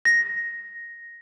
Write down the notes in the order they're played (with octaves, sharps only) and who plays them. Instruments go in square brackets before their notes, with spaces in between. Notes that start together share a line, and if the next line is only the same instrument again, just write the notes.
[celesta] A#6